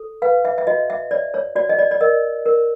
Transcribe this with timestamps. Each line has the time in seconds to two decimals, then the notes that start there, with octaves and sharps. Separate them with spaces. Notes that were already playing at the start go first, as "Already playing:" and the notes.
Already playing: A4
0.22 B4 F5
0.45 E5
0.58 E5
0.67 F#4 D#5
0.90 E5
1.11 C#5 D5
1.34 C#5
1.56 F#4 D5
1.69 D#5
1.79 D5
1.91 D5
2.01 A#4 D#5
2.46 A#4